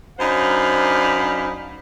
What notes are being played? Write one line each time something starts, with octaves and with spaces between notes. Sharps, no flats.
F#2 D4 D#4 C5 F5 B5